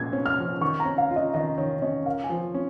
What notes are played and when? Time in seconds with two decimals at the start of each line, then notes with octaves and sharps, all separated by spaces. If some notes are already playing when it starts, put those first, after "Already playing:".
Already playing: A#2 F3 G#3 G#6
0.13 C#4
0.26 F6
0.38 F3
0.61 D#3 C#6
0.80 A#5
0.85 C#4
0.98 F5
1.10 F4
1.16 D#5
1.34 D#3 D#5
1.58 D#3 C#5
1.82 C#4 D#5
2.06 A#4 F5
2.24 G#5
2.30 F3
2.54 C#4